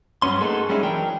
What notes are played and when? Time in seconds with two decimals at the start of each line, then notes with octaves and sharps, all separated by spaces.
0.22 G2 F#3 B3 C#4 C6
0.41 A3 A#3 D#4 F#4 G#4 A4
0.69 G3 G#3 C#4 D#4 E4 G#4
0.83 E3 F#3 D4 A#4 G5